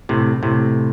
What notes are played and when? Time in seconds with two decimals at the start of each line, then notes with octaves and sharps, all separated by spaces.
0.09 A2 C3
0.43 A2 C3